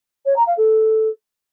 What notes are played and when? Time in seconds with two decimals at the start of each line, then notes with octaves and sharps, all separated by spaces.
0.25 C#5
0.35 A#5
0.46 F5
0.57 A4